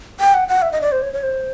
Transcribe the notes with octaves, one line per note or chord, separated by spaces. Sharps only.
G5
F#5
F#5
E5
D#5
D5
C5
C#5
C#5
C5